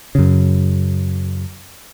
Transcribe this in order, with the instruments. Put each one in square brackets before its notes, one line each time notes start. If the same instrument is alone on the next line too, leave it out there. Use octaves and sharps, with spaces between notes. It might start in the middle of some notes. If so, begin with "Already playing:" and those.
[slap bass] F#2 C#3